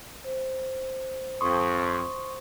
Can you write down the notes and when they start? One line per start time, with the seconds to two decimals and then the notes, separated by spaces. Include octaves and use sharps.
0.24 C5
1.41 F2 C6 C#6 D#6